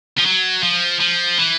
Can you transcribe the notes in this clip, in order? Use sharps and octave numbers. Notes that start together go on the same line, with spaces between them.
F3
F#3
F3
F3
E3